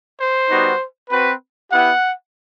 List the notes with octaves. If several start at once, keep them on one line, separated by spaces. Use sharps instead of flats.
C5
G3 B3 D#4 F#4
C4 F#4 B4
B3 E4 G4 F#5